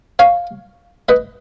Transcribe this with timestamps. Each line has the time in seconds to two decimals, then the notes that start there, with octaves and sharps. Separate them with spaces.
0.19 C#5 F5
1.09 B4 D#5